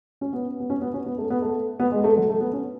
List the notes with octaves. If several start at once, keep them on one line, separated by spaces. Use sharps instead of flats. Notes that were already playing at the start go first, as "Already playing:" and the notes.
C#4
B3
B3
C#4
B3
C#4
B3
A3
B3
A3
B3
G#3
A3
F#3
A3
B3
C#4